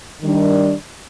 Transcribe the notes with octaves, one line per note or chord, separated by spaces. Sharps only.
D#3 G3 D4